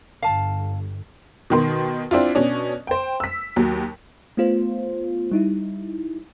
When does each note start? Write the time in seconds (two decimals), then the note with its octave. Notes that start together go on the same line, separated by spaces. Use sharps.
0.22 G1 F5 A5
1.50 B2 D#3 C6
2.11 C4 D4 E4 F4
2.35 B2 C#4 D4
2.87 C5 G5
3.20 E6 B6
3.56 D#2 F#3
4.37 A3 B3 F4 C5
5.31 G3 D#4 E4